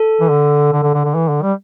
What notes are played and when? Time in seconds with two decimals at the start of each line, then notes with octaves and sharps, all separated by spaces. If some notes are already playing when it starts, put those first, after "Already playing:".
Already playing: A4
0.21 E3
0.30 D3
0.73 D3
0.83 D3
0.94 D3
1.05 D3
1.15 E3
1.29 D3
1.43 G3